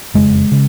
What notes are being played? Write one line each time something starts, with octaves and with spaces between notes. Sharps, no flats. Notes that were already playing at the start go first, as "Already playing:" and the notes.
F#1 F2 C#3 G#3
C#3